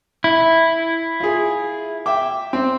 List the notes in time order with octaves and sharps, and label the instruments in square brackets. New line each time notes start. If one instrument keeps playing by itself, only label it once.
[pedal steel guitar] E4
[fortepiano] F4 G#4
E5 G5 D6
C4